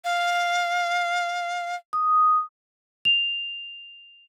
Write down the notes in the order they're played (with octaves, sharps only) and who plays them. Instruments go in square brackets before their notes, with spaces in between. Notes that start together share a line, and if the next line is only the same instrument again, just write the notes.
[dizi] F5
[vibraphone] D#6
[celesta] F7